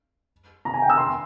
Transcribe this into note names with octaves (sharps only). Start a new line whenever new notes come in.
A#5
G#5
G5
E6
C6